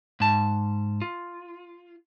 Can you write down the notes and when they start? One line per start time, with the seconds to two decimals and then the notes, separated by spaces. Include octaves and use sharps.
0.20 G#2 A5
1.02 F4